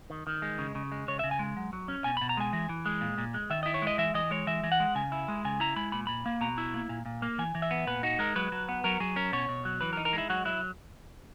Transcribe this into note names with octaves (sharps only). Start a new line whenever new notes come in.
D#3
D#3
G#3
C#3
C#3
G#3
C#3 C#5
C#3 E5
G#5
G#3
F#3
F#3
C#4
B2 G#5
B2 B5
A#5
G#3 G#5
E3
E3
G#3
A#2
A#2
G#3
D#3 E5
E4 D#5
C#5
G#3
D#5
E3 E5
E3 D#5
G#3 C#5
E3 E5
E3
F#5
G#3
C#3 G#5
E4
G#3
C#3 G#5
E4 A#5
G#3 B5
A#2 B5
A#2 B5
A#3
B2 A#5
E4
A#3
A#2
A#2
A#3
E3 G#5
E3
E5
B3
A#2 B4
D#4 F#4
G#3 A#4
F#3 B4
F#3
B3
F#3 A#4
F#3 G#4
C#4 A#4
B2 C#5
B2
F#3
E3 B4
A#4
D#4
A#4
G#3 E4
F#3 F#4
F#3 E4